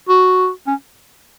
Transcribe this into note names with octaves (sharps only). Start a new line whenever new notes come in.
F#4
C#4